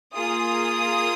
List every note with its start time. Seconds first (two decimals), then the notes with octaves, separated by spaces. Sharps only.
0.12 A#3 F4 G#4 D#6